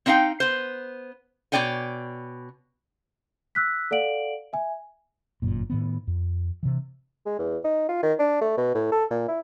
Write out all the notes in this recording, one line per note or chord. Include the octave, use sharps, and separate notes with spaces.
C4 D4 D#4 F5 G5
B3 C5
B2 F#4 C#5 D5 G5 G#5
E6 F#6 B6
A4 D5 F5 F#5 D7 F#7
E5 G#5
G1 F#2 A#2
A2 D#3 B3
F2
C3 E3
G#3
E2
D#4
F4
D#3
D4
A3
B2
A2
A4
A#2
E4